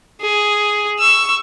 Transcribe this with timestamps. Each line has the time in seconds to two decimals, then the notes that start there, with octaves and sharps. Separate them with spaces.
0.21 G#4
0.99 C#6 E6